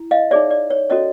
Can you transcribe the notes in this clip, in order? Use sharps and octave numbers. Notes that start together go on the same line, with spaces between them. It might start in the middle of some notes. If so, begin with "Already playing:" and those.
Already playing: E4
D#5 F5
D#4 G#4 C#5 D5 E5
D5
C#5
C#4 F#4 A4 C#5 D#5